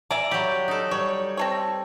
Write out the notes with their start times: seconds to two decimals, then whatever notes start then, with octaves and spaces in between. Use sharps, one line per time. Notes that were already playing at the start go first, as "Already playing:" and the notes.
0.11 D5 E5 G#5 A#5
0.31 F#3 G3 G4
0.68 D#4 A4
0.91 G3 C#5
1.37 C4 A4 C#5